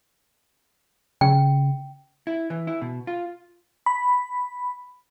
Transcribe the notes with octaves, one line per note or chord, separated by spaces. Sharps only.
C#3 G5
E4
E3
E4
B2
F4
B5